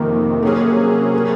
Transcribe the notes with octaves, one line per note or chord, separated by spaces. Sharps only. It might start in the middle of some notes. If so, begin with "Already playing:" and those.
Already playing: F2 C3 D#3 A#3
C3 F#3 A#3 C#4 G#4
A#3